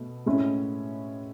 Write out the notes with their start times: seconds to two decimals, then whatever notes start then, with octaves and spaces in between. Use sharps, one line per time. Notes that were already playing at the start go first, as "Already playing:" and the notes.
Already playing: B2 A3
0.26 A2 G#3 C#4 E4